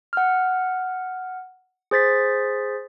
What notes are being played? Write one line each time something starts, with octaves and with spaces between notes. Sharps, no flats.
F#5 F6
G#4 C5 A6 B6